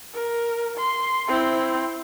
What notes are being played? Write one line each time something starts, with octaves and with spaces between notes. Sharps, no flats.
A#4
C6
C4 E4